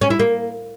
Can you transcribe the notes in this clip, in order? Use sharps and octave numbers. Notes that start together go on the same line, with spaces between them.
C#4
E4
A#3